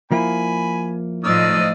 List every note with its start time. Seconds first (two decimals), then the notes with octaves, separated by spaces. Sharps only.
0.11 F3 A#3 E4 G#5 B5
1.24 A2 D#3 F3 D5 D#5 E6